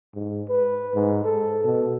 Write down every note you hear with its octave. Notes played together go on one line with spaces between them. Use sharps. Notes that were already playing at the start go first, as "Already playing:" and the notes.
G#2
B4
G#2
A4
B2